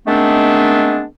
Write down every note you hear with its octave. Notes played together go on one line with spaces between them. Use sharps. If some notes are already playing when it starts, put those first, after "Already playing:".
D#3 G#3 A3 B3 C4 D4